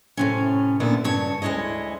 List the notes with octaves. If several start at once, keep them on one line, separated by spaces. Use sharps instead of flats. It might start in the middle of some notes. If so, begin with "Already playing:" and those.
A2 C3 C#4
A#2 D3 B3 E4
G2 C#3 C#5 A5
D2 G#3 E4 C#5 D#5